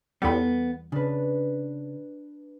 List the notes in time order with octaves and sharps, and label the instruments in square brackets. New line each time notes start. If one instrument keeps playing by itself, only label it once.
[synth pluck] E2 G3 [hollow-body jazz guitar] B3 A4 B5
[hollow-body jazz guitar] C#3 [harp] D4 B4